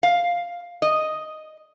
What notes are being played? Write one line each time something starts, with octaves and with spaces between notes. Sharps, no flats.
F5
D#5